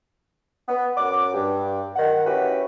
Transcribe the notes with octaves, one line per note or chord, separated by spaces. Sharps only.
B3
F#2 F#5 D6
G2
D#3 F#5
C#4 E4 F#4 G4 B4